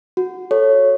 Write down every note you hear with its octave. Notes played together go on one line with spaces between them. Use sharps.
F#4
A4 C#5